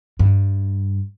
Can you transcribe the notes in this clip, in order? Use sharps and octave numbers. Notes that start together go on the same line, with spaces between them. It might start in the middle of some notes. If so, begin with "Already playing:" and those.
G2